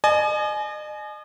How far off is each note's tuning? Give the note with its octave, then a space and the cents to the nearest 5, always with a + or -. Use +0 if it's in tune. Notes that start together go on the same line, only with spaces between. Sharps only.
D#5 -40 G#5 +30